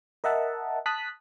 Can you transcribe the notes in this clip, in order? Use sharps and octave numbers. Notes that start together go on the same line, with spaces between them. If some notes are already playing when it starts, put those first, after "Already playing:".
A#4 D#5 E5 F#5 A5
A5 D#6 F#6 B6